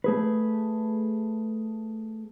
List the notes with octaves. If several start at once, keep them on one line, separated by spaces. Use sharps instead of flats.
A3 G#4 B4